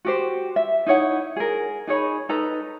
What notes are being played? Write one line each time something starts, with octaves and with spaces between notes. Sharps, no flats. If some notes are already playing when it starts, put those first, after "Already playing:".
F#4 G4 C5
E5
D#4 E4 C#5 F#5
G#4 A#4
D#4 G#4 C#5 B5
D#4 A4 B4 A#5